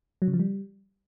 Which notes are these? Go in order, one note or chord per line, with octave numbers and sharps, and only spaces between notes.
F#3
C#3
F3
G3